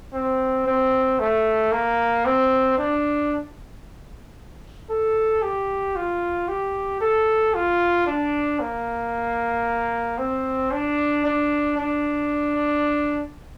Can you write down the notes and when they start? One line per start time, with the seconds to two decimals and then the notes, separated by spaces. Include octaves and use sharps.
0.13 C4
0.66 C4
1.20 A3
1.72 A#3
2.26 C4
2.78 D4
4.90 A4
5.42 G4
5.96 F4
6.48 G4
7.01 A4
7.54 F4
8.07 D4
8.60 A#3
10.18 C4
10.71 D4
11.25 D4
11.78 D4